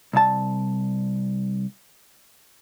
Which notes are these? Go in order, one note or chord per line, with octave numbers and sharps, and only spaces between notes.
C2 A5